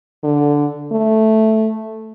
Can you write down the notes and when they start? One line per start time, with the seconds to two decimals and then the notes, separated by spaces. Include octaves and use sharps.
0.24 D3
0.92 A3